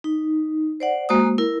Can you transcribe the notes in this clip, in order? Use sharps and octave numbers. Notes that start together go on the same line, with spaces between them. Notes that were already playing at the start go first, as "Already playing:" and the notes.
D#4
C5 D5 F#5
G#3 A#3 F#4 C5 G#5 D#6
E4 A#4